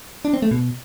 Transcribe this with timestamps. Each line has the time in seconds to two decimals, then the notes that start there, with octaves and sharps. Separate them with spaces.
0.25 D4
0.34 C4
0.42 A3
0.51 B2